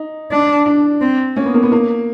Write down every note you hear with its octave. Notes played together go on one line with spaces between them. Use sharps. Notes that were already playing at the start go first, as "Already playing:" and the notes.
Already playing: D#4
D4
D4
C4
A#3 C#4
B3
A#3
B3
A#3